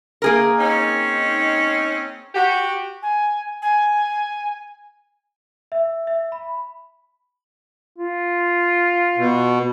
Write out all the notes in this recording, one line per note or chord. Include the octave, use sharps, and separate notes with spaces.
A#3 G#4 A#4
C4 C#4 D#4
F#4 G4
G#5
G#5
E5
E5
B5
F4
B2